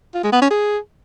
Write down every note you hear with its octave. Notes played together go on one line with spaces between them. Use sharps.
F4
G#3
B3
C#4
G#4